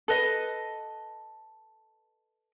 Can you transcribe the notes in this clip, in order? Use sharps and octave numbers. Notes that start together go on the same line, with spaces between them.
A4 B4 D#5